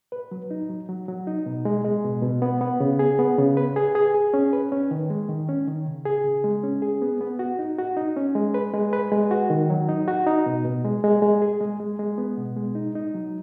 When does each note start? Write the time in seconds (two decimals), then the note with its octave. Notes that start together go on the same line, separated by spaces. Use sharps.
0.12 B4
0.31 F#3
0.51 D#4
0.69 F#3
0.89 F#3
1.08 F#3
1.27 D#4
1.46 B2
1.65 G#3
1.85 G#3
2.04 B2
2.22 B2
2.42 B3
2.61 B3
2.80 C#3
2.99 G#4
3.19 B3
3.38 C#3
3.57 B4
3.76 G#4
3.95 G#4
4.14 G#4
4.34 C#4
4.53 B4
4.72 C#4
4.91 D#3
5.10 G#3
5.29 D#3
5.49 C#4
5.67 D#3
5.86 C#3
6.06 G#4
6.24 C#3
6.44 G#3
6.63 C#4
6.82 G#4
7.02 B3
7.21 B3
7.39 F#4
7.59 D#4
7.78 F#4
7.97 D#4
8.16 C#4
8.35 G#3
8.54 B4
8.74 G#3
8.93 B4
9.12 G#3
9.31 F#4
9.50 D#3
9.70 F#3
9.88 D#4
10.08 F#4
10.27 D#4
10.46 B2
10.65 B2
10.85 G#3
11.04 G#3
11.22 G#3
11.42 G#4
11.61 G#3
11.80 G#3
11.99 G#3
12.18 B3
12.38 B2
12.57 G#3
12.75 D#4
12.95 D#4
13.14 F#3